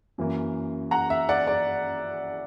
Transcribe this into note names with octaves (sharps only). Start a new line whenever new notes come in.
F#2 E3 A#3
F#5 A#5
E5
D5 F#5
D5